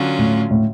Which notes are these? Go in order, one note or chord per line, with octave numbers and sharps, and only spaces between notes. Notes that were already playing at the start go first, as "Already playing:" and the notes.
Already playing: D3 F#3 C#4 F4
A2
A2